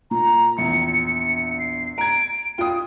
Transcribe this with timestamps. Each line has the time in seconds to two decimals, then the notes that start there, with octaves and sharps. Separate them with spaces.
0.11 A#2 A#5
0.58 A#1 E2 C#7
1.59 C7
1.98 A#5 G#6 D7
2.58 F4 G5 D#6